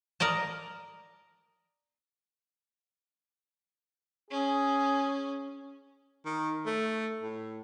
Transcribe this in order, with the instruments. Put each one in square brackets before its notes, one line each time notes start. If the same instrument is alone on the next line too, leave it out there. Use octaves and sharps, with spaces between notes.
[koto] A#4 D5 D#5 A5
[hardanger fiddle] C#4 [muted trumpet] G#4
[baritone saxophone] D#3
A3
A2